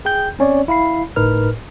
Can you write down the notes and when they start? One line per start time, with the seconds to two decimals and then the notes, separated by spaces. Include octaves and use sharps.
0.05 G#4 G5 G6
0.39 C4 C#4 C#5 D5
0.68 E4 F5 B5 C7
1.16 G1 A2 D#4 A#4 B4 F6